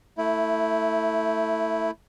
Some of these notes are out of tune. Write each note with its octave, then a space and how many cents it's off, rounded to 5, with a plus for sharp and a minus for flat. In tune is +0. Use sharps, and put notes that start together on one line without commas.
A3 +15 E4 -5